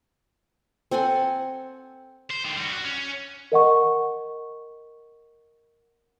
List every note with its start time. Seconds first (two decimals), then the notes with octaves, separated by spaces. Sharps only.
0.91 C4 A4 F#5 G#5
2.31 C5
2.44 D3 D#3
2.57 G3 F#4
2.72 F#4
2.84 C#4
3.52 A#4 D#5 F#5 C#6